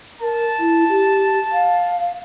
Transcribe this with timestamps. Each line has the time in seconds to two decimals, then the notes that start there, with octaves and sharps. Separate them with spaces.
0.21 A#4 A5
0.59 E4
0.89 G4
1.52 F5